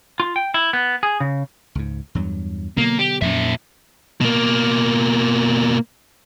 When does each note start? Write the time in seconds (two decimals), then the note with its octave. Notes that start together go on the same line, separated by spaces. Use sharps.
0.20 F4
0.36 G5
0.54 E4
0.73 B3
1.03 G#4
1.20 C#3
1.75 C#2 G#2
2.15 E2 G2 F#3
2.77 B2 D3 F#3 A#3
2.99 G4
3.22 F2 A#2 F#3 C#4 E5
4.21 B2 A#3